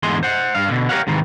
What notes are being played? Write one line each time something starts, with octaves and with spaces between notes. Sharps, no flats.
E2 G#2 D3 G#4 C6
C5 F#5
G2 F5
B2 D3
G4 A#4 B4 C#5 F5 F#5
G#2 C3 D#3 E3